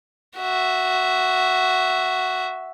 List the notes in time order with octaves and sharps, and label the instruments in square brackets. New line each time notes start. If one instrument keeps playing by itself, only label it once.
[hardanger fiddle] F#4 E5